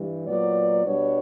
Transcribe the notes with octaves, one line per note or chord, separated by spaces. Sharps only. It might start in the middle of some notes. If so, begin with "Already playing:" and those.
Already playing: G2 E3 G3
A#2 F#3 B3 D5
B2 G3 B3 D4 C#5